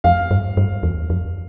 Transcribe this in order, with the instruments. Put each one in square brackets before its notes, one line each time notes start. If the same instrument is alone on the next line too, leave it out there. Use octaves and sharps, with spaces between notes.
[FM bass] F2 [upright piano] F5
[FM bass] G2
G2
E2
F2